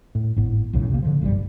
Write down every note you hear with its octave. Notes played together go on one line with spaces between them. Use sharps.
A2
G#1 A2 B3
B1 E2 A2 C#3
C3 A#3
D3 E3 F3
F#1 B1 G2 G3